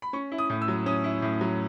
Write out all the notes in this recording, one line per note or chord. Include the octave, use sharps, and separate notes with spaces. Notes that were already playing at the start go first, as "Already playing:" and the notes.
B5
C#4 C#6
E4
D#6
A2
E6
F#3
C#4 D#6
E4
A2
F#3